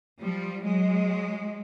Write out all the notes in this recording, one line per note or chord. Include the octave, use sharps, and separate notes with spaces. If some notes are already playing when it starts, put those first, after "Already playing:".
F3 G3
F#3 G#3